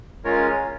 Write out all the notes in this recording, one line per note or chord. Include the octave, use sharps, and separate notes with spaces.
G#3 C#4 F4 A#4 C#5